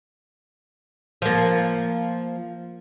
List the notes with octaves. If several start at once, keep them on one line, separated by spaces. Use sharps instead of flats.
F3 A#3